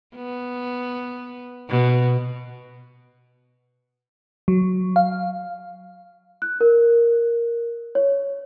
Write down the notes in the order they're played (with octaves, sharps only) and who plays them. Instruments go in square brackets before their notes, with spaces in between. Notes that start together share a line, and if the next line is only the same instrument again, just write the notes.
[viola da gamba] B3
B2
[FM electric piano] F#3
F5
[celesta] F#6
A#4
C#5